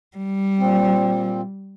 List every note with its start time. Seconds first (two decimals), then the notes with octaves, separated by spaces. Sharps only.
0.17 G3
0.59 A#2 C4